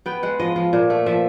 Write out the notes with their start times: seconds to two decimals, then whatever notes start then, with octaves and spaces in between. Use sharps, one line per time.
0.06 B3 G5
0.23 G#3 F#5
0.40 F3 D#5
0.56 F3
0.73 A#2
0.90 A3
1.06 F3 E5